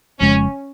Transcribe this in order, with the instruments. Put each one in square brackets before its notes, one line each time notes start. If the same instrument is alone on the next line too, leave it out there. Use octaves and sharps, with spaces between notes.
[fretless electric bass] F1 F2 C#3 G#3 [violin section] C#4